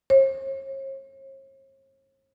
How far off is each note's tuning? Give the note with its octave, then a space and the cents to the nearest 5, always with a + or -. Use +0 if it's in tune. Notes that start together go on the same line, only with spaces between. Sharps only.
C#5 -45